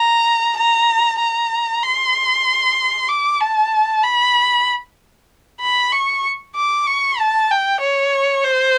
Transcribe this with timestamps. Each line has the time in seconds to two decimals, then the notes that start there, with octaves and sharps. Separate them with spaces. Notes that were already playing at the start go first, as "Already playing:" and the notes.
Already playing: A#5
0.57 A#5
1.20 A#5
1.83 C6
3.09 D6
3.40 A5
4.03 B5
5.61 B5
5.92 C#6
6.56 D6
6.87 C#6
7.19 A5
7.51 G5
7.81 C#5
8.45 C5